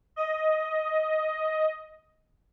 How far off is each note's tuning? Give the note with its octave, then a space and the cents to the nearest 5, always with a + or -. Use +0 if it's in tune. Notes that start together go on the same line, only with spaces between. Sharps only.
D#5 +10